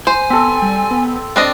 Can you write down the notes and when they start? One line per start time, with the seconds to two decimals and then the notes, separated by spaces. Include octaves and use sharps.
0.07 C5 G#5
0.30 B3 C4 A4
0.62 G3
0.91 B3
1.36 C4 D4 D#5 A6